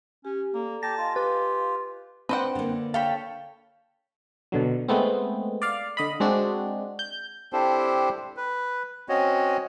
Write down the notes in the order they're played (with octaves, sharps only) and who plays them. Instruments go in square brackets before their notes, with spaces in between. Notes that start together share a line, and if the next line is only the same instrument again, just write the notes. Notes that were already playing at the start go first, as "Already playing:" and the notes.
[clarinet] C#4 [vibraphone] G4
[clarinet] A#3 [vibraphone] A4 D5 A#5
[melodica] G4 [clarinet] A5 [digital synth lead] A#6
[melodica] F4 [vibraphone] D#5 F5 G#5
[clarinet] G4 [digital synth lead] B4
[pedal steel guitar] C4 D4 G5 [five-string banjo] B4 C5 F#5
[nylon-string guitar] D3 A#3
[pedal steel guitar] A4 C#5 A5 [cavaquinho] F5 G5 B5
[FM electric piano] B2 D3 F#3
G#3 A3 B3 C4
D5 F5
D3 D#5 B5
G#3 C4 D4 F#4
G6
[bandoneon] C4 D4 E4 G4 A4 C5
B4
C4 C#4 F#4 C#5 D#5